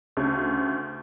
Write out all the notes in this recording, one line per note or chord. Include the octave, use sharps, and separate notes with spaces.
D2 C#3 A3